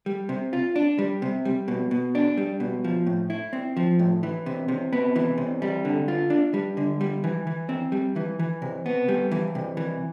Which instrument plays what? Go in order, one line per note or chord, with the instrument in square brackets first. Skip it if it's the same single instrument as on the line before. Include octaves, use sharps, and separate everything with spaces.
[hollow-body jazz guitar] G3
C3
F4
D4
G3
C3
G3
B2
B2
D4
G3
B2
F3
A2
E4
C4
F3
A2
E3
C3
C3
B3
E3
C3
G3
D3
F4
D4
G3
D3
G3
E3
E3
C4
G3
E3
E3
C3
B3
G3
E3
C3
E3